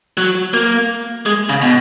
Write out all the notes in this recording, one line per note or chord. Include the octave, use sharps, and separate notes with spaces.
F#3
A#3
G#3
C#3
B2